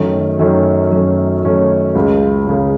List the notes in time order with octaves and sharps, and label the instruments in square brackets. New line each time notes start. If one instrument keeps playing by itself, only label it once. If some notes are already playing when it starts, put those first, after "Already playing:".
Already playing: [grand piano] F#2 D#3 A3 C#4
F#2 D#3 A3 C#4
F#2 D#3 A3 C#4
F#2 D#3 A3 C#4
C#2 C#3 G#3
C#2 C#3 G#3